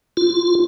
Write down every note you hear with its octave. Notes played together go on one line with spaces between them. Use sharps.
F4